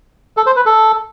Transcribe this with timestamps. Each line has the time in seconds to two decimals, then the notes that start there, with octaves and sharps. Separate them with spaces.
0.37 A4
0.46 C5
0.56 B4
0.66 A4